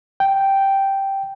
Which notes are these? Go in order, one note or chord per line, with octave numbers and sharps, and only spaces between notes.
G5